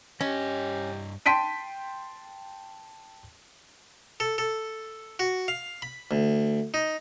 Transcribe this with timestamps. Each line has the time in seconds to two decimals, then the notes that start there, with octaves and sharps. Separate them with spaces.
0.20 G2 C#4 G4 D#5
1.26 G5 A5 C6 B6 D7 D#7
4.20 A4
4.38 A4
5.19 F#4
5.48 F5
5.82 B5
6.11 D2
6.74 D#4